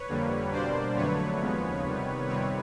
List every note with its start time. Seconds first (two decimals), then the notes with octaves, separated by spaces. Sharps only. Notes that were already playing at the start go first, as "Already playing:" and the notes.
Already playing: B4 C#5
0.09 F2 D3 G3 A#3
0.52 B2 G3 A#3 D4 C5 D5
0.96 F2 D3 F#3 A3 D4 B4 C#5
1.40 D#2 C#3 F3 G#3 B3
1.84 C3 D#3 G3 B3
2.28 F2 C3 D#3 G3 C4 B4 C#5